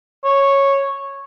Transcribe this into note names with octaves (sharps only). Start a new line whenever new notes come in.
C#5